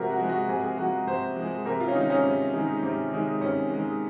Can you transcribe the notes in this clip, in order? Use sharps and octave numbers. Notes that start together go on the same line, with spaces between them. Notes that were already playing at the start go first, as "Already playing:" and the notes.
Already playing: C3 F3 G#3 F#4 A#4
F#4
F3 G#3
F#4
C3 G#4
G#4
F3 G#3 F#4
C3 C5
F3 G#3
C3 A#4
F4
C#4
D#3 G#3 D#4
C#4
C3
D#3 G#3
C3
D#3 G#3
C3 C#4
D#3 G#3